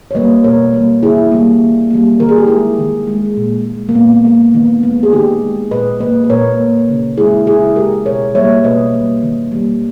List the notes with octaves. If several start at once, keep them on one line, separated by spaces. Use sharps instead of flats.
C#5
G3 A#3 B4 D#5
B2 A#4 C#5
G3 A#3
D#3 E4 G#4
G3 A#3
D#3
G3 A#3
D#3 A#4
G#4
G4
G#3 E4 G#4
D#3
G#3
A#2
G#3
A#3
A#2 B3
G#3 A#3
D#3 B3
G#3 B3
G#4
D#3 D#4 G4
G#3
A#2 B4 D#5
A#3 B4 D#5
B4
A#2 A#4 C#5
A#3
C#3
G#3 E4 G#4
C#3 E4 G#4
G#3 G4 A#4
B2 A#4 C#5
G3 A#3 C#5 E5
B2 B4 D#5
G3 A#3
D#3
G3 A#3